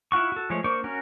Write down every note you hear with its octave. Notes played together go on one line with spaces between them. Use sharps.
E4 F4 F#5 C#6
F#4 A4
F3 G#3 A3 C#5
A#3 D4 C5 D5 C#6
C#4 F#4 A#4